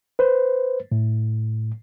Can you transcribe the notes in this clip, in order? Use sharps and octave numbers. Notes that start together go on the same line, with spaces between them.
B4 C5
A2